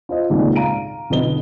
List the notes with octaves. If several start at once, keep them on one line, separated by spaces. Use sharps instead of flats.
F4 C5 D#5
G#1 C#2 A#2 D#3
F5 A#5 D7 D#7
B1 F2 D3 B3 D#5 G7